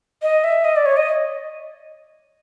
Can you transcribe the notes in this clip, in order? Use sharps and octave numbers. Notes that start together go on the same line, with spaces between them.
D#5
E5
D#5
D5
C#5
D#5